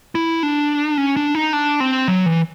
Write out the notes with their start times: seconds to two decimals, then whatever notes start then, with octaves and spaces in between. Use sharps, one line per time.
0.15 E4
0.43 D4
0.98 C#4
1.16 D4
1.35 D#4
1.53 D4
1.80 C4
2.08 F#3
2.26 E3